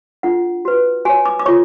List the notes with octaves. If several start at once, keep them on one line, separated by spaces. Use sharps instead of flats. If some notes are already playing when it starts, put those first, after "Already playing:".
D4 F4 A4 F#5
F#4 B4
F#4 C#5 G#5
D6
D6
F4 A4 C#5 C#6